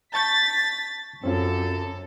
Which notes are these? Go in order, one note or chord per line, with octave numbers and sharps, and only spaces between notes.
A5 C#6 G6 A6 B6
F#2 C4 C#4 F4 A4